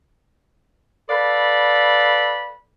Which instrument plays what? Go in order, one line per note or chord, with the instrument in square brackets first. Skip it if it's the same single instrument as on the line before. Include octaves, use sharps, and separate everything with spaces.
[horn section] A4 B4 D5 F5 B5